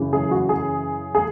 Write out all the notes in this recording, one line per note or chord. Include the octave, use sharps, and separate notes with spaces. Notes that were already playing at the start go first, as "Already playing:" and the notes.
Already playing: F#2 C#3 E3
G#4
F#4
G#4
G#4